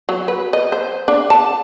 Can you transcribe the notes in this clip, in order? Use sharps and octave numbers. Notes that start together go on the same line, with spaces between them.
F#3
B4
D#5
C5
D4
A5